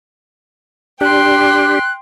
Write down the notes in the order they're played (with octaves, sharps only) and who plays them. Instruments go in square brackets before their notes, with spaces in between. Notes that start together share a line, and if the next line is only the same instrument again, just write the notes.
[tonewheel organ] D4 G4 [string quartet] G5 C6 [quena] F#6